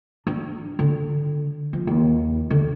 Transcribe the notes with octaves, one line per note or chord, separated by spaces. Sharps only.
D4
D3
F3
D#2
D3